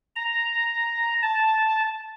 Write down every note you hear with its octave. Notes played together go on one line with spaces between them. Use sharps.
A#5
A5